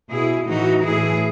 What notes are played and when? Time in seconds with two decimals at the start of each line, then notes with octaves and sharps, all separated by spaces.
0.10 B2 E4 G#4
0.47 A2 E3 D#4 F#4
0.85 A2 E3 E4 G#4